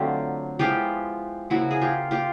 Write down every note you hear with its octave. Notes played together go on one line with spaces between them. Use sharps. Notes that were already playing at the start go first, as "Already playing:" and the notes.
Already playing: D3 F#3 A3 C4 F4 G4
F3 G#3 B3 E4 F4 G4
C#3 F3 A#3 E4 F#4
G#4
F4 G4
F4 G4